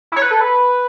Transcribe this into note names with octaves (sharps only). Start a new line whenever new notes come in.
E4
C#5
B4
A4
B4